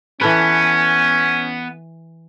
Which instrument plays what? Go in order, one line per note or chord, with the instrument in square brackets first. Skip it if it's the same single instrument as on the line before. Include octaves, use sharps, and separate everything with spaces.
[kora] E3 A4 B4 [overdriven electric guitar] B3 [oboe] C#4